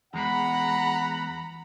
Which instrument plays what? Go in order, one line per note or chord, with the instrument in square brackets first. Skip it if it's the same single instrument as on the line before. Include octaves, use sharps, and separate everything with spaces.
[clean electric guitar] E2 G#3 [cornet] F#5 [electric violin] A#5 B5